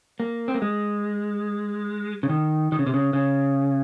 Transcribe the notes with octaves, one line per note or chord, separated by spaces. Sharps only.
A#3
C4
A#3
G#3
C#3
D#3
D#3
C#3
C3
C#3
C#3